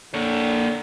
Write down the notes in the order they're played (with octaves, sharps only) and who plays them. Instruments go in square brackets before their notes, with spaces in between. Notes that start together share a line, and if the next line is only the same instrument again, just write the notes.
[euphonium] D3 [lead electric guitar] A#3 C#5